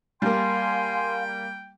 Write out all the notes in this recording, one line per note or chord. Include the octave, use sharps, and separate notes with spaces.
G3 A#3 F5 G5 G#5 C6